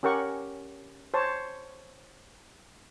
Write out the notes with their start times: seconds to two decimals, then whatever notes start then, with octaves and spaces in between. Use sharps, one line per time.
0.03 C#4 G4 A#4 F#5 C#6
1.14 C5 C#5 A5